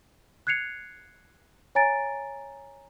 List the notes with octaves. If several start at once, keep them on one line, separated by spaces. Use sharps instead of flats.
F#6 G#6 C7 C#7 F7
C#5 G#5 A#5 A6 D7